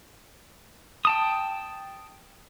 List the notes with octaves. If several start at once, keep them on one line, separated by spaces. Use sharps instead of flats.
G5 A5 D#6